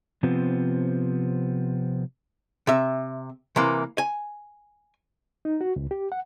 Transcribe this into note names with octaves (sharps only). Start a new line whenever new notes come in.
C3 F3 B3 C4
C3 E5
C3 E3 A#3
G#5
D#4
F#4
C#2
G4
F#5